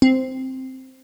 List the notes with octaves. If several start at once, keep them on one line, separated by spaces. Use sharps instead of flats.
C4